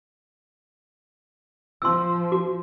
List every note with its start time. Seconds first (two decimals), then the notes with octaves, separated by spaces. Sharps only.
1.82 F3 C6 E6
2.32 F#4